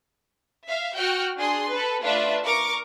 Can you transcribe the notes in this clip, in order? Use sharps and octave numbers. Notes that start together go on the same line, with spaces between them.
E5 F5
F#4 G5 F6
D4 G#4 C6
A4 B4
A3 D4 F4 B4 E5
A#4 C#6 D6